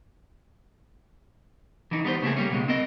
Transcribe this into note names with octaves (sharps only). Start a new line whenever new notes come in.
E3 D#4
G3 B3 A4 C5
C#3 A3 A#3 G#4
G3 A#3 C#4
C#2 B2 G#3
C4 A#4 D#5